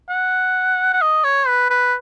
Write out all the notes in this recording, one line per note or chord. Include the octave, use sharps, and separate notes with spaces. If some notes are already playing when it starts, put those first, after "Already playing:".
F#5
F#5
D#5
C#5
B4
B4